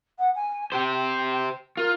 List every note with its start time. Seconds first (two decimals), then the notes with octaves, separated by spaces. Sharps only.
0.19 F#5
0.35 G#5
0.72 G4 C5 G5
1.77 F4 A#4